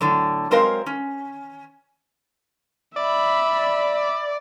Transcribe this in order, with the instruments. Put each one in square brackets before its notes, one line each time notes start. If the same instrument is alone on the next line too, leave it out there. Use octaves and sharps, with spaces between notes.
[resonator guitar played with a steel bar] A2 D3 F#3
F#3 G#3 C4 A#4 C5 F5
C#4
[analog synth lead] D5 [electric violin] E5 B5